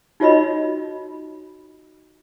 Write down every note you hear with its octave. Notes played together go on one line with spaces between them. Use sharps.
D#4 F4 F#4 C#5 D#5 B5